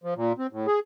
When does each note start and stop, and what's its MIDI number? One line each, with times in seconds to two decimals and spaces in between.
0.04 0.14 53
0.16 0.33 46
0.39 0.47 60
0.52 0.67 45
0.67 0.79 68